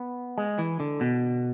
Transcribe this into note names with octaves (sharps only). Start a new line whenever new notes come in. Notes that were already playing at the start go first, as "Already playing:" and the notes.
Already playing: B3
G#3
E3
D3
B2